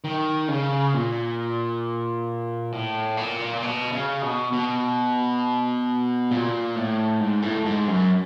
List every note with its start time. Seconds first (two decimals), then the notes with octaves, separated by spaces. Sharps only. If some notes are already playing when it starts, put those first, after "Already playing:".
0.04 D#3
0.48 C#3
0.94 A#2
2.72 A2
3.17 A#2
3.63 B2
3.92 C#3
4.22 B2
4.52 B2
6.31 A#2
6.76 A2
7.21 G#2
7.42 A2
7.65 G#2
7.88 F#2